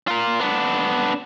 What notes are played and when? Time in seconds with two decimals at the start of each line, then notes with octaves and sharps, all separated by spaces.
0.08 F4 A#4
0.40 B3 D4